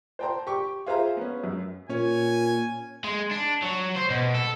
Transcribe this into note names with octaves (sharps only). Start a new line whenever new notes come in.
C5 D5 G5 A5 A#5 C6
G4 G5 C#6 D6
F4 G#4 C5 E5 F5 A#5
B3 C#4
F#2
A#2 C#4 C#5 G#5
G#3
D4
F#3
C5
B2
A4